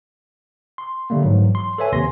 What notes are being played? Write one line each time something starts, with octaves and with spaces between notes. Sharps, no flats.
C6
D3 G3 A3 A#3
G#2 E3 F#3
C6
A4 B4 C#5 E5 G#5
D#2 C3 C6 A#6